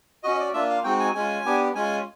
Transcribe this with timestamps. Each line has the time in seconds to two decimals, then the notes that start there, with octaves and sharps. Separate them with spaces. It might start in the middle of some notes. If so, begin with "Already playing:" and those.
0.23 C#4 F#4 D#5
0.35 D#5
0.39 D5
0.53 A#3 D4 F4 E5
0.69 F5
0.84 G#3 C4 D#4 F#4 G5
1.00 G#5
1.14 G#3 C#4 F4 G#5
1.45 B3 D4 G4
1.75 G#3 C#4 F4 G#5